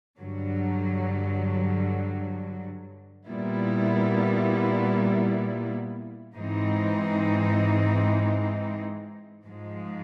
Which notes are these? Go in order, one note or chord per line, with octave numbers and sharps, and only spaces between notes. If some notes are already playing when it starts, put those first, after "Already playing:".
G2 D3 F#3
A#2 G3 B3 E4
G#2 E3 G#3 C4 D#4
G#2 F3 G#3